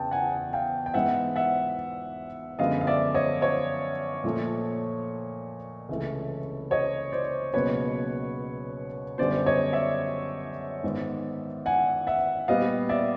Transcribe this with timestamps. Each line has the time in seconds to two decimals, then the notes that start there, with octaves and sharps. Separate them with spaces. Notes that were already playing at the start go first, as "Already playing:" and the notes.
Already playing: E2 C#3 G5 A5
0.11 F#5 G#5
0.53 F5 G5
0.86 G5
0.94 G#2 E3 G#3 B3 E5 F#5
1.36 E5 F#5
2.59 F#2 D3 F3 G#3 B3 D#5 F5
2.81 F5
2.87 D5 E5
3.14 C#5 D#5
3.41 C#5 D#5
4.24 A#2 F3 A3
5.89 C#2 C3 E3 A3
6.71 C#5 D#5
7.12 C5 D5
7.54 C#2 B2 F#3 A#3 B4 C#5
9.18 F#2 D3 G3 B3 C5 D5
9.46 C#5 D#5
9.73 D5 E5
10.83 G#2 D#3 G#3 B3
11.66 F#5 G#5
12.07 E5 F#5
12.48 A#2 G3 B3 D#5 F5
12.89 D5 E5